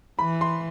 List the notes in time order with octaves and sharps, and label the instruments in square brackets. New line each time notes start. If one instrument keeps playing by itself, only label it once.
[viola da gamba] E3 [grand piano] B5
[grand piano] C6